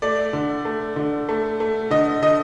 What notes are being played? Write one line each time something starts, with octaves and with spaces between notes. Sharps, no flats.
A3 D5
D3
A3
D3
A3
A3
D3 D#5
D3 D#5